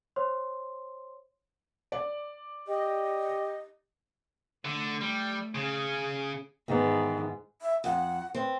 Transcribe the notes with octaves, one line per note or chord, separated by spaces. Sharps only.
C5 C#5 C6
D5
G4 D#5
D3 A3
G3
C#3 C#4 G#4
G#2 D#3 E3 B3
E5
F2 F#5
C4 B4